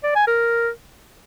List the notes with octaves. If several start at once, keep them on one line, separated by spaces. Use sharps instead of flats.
D5
G#5
A#4